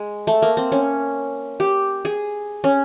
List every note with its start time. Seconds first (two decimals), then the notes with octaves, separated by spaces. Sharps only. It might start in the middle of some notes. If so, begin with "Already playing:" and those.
Already playing: G#3
0.27 A3
0.42 A#3
0.57 C4
0.72 C#4
1.60 G4
2.05 G#4
2.64 C#4